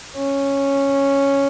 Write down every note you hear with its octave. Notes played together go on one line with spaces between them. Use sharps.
C#4